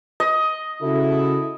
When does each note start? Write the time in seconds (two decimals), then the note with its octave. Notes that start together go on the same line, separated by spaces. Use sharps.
0.20 D#5
0.82 C#3 E4 F#4 A4